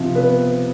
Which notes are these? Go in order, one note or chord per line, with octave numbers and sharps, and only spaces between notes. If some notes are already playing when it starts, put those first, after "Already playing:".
Already playing: C3 F3
B3 B4